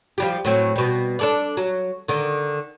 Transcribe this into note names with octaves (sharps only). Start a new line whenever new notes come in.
F3 G3 G4
A2 F#3 C4
B2 G3
D4 A4 D5
F#3
D3 D#3